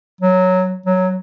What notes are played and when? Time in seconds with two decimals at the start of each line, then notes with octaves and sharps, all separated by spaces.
0.21 F#3
0.86 F#3